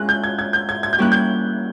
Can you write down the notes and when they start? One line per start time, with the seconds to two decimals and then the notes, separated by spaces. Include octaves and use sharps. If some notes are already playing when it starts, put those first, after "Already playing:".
Already playing: G#3 C#4 F4 G#4 F#6
0.09 G6
0.24 G#6
0.39 G#6
0.53 G6
0.69 G#6
0.83 G#6
0.93 G6
0.98 G3 A#3 C#4 E4 G4 F#6
1.12 G6